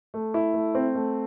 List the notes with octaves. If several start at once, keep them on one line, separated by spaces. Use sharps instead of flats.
A3
E4
A3
C4
A3